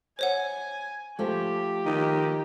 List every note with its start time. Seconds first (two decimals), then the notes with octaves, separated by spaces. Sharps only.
0.19 C5 C#5 F#5 G#5
1.19 F3 A3 G4
1.86 D#3